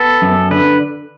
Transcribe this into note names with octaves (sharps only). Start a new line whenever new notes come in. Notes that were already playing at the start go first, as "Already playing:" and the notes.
Already playing: B3 A4
F#2
D3 B4